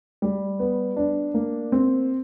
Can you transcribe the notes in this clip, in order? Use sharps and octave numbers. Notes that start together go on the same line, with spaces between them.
G3
B3
D4
A#3
C4